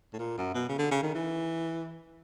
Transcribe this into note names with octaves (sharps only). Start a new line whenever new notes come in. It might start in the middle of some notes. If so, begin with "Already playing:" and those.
A2
A#2
F#2
B2
C#3
D3
C#3
D#3
E3